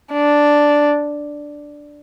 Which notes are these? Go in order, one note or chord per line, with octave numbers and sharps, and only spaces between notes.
D4